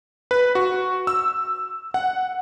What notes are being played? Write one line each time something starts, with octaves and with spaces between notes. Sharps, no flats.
B4
F#4
E6
F#5